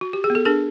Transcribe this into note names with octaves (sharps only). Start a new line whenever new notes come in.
F#4
G4
G#4
B3
A4
D4 G#4 A#4